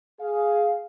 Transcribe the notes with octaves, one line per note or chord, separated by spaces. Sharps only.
G#4 F5